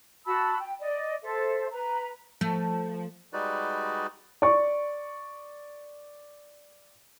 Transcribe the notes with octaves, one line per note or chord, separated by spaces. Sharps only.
F#4 A5 B5 E6
G5
D5 D#5
A4 C5 E5
B4 A#5
F3 A3
G3 G#3 D#4 F#4 B4 D5
D5 C#6